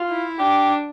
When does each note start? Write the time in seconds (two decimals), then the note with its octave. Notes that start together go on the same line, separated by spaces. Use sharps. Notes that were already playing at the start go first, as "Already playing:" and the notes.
Already playing: F4
0.09 E4
0.39 D4 G4